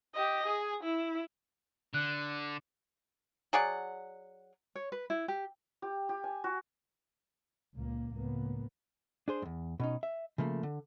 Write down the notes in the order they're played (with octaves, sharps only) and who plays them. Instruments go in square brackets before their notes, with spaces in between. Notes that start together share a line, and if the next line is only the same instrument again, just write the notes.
[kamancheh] G4 D#5
G#4
E4
[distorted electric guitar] D3 [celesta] F#6
[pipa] F#3 G#4 D5 F#5
[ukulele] C#5
B4
E4
G4
[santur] G4
G4
G#5
F#4
[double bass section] C#2 A#2 A#3
C#2 A2 A#3 B3
[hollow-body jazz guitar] D4 G#4 C5
E2 G2
B2 C#4 D#4
E5
C#3 F3 A3 A#3
D3